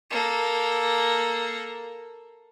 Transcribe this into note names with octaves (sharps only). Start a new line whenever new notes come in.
A#3 A4